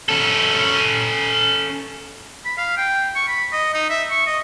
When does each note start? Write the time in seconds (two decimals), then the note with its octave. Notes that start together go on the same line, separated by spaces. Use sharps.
0.09 C#4 A4
2.45 B5
2.58 F5
2.77 G5
3.16 C#6
3.28 B5
3.52 D#5
3.74 D#4
3.90 E5
4.11 C#6
4.27 D#5